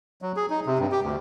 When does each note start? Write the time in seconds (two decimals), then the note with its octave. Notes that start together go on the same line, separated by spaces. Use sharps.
0.22 F#3
0.36 G#4
0.50 D#4
0.66 C3
0.79 G2
0.92 G4
1.03 D2